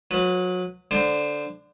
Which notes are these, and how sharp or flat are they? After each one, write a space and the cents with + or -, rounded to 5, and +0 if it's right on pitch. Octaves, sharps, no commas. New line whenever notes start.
F#3 -30 B4 +0
D3 +0 C5 +0 D6 +35